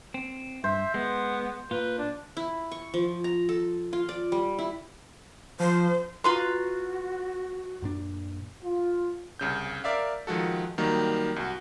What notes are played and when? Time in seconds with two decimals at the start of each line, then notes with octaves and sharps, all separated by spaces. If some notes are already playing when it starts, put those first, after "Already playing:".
0.14 C4
0.64 G2 C5 E5
0.94 G#3 B3
1.71 A#2 F4 B4
1.98 D4
2.37 E4
2.72 C#6
2.94 F3
3.24 A#5
3.49 A4
3.93 F4
4.09 D5
4.32 G3
4.59 E4
5.60 F3 C5
6.24 F4 F#4 B4 A#5 C6
7.82 F#2 A#2 D4
8.63 F4
9.39 C2 C#3 G6
9.84 A#4 D5 E5 F5
10.27 D#3 F3 G#3 F#4 A4
10.78 D#3 F#3 G3 A#3 D#4
11.36 C2 F#4